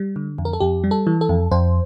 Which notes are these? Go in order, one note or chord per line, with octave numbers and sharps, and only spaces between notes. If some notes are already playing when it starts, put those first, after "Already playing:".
Already playing: G3
D3
F2
A#4
A4
F2 G4
G3
A4
E3
A4
F2
F2 C5